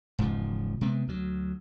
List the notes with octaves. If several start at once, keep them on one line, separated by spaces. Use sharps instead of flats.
E1 G#2 C#3 F3
C3 G#3 B3 C4
D2 F#3